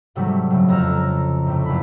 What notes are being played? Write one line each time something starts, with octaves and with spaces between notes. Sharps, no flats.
G#2 C3 D#3 F#3 G3 A3
A2 C#3 F#3
F2 A#5 E6 F6
A#5
A2 C3 A3
F#1 E2 E4 B5